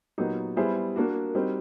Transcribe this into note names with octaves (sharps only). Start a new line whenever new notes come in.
A#2 F#3 B3 D#4 G4
G3 B3 E4 G#4 C5
A#3 D4 F#4
G3 C4 D#4 F#4